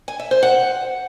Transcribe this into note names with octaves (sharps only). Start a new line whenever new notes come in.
G#5
E5
C5
F#5